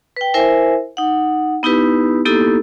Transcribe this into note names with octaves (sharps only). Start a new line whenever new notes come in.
B4 G5
E4 A#4 C5 E5 G#5
D#4 F#5
B3 D#4 E4 G4 B4
A#3 B3 D#4 E4 G4 A4